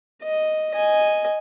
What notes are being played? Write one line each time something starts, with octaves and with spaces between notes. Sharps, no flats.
D#5
D#5 G#5